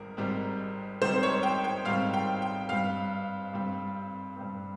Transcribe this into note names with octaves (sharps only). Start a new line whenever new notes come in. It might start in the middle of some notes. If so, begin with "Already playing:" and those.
Already playing: G#1 G#2 G3 A#4
G#1 G#2 G3 C4
G#1 G#2 G3 C4 C5
C#5
G5
G5
G#1 G#2 G3 C4 F5
G5
G5
G2 G3 C4 F5
G2 G3 C4
G2 G3 C4